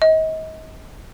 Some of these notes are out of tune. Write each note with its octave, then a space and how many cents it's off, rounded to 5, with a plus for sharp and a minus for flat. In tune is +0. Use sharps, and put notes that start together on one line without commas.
D#5 +35